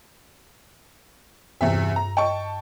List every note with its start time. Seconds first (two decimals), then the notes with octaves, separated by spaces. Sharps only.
1.61 E2 G2 C3 E5
1.96 A#5
2.17 D#5 G5 A5 C#6